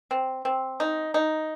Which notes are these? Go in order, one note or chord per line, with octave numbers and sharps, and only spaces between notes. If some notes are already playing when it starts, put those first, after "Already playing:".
C4
C4
D#4
D#4